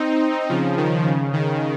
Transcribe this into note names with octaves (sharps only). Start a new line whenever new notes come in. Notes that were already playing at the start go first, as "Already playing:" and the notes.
Already playing: C4 D#4
C#3 F3
D#3
C#3
D#3